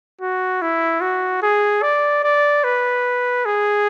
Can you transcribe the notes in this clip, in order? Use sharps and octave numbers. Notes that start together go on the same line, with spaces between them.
F#4
E4
F#4
G#4
D5
D5
B4
G#4